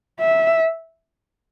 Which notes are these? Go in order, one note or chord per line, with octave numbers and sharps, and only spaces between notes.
E5